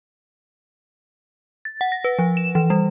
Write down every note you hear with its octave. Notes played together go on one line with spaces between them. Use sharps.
A6
F#5
A#6
B4
F3
E7
E3
G3